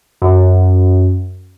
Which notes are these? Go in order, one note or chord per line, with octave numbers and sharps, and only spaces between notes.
F#2